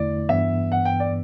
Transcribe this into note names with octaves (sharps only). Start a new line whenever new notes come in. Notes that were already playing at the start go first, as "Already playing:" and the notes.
Already playing: E2 D3 A3 E4 D5
G2 E3 B3 E5
F#5
G5
D5